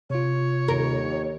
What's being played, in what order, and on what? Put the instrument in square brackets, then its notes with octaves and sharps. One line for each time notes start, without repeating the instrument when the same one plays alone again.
[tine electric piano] C3 F4 [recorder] C#5
[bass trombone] D#2 [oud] A#4